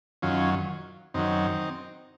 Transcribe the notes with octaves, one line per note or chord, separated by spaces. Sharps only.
F#2 D#3 F#3 C#4 F4
F#2 D#3 F#3 C4 D#4